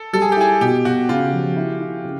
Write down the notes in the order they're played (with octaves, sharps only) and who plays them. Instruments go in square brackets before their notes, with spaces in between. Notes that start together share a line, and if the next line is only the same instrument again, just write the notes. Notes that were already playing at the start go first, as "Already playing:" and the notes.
Already playing: [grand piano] A4
[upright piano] G3 [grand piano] A4
[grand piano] G#4
G4
[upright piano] E4 [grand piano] G#4
[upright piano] B2 [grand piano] G4
[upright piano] B2 [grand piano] F#4
[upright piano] C#3 [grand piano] F4
[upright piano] F3
E4
E4
C#3